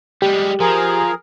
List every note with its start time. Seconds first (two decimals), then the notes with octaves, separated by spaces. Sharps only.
0.22 G3 G#3 G4
0.60 F3 G#4 A#4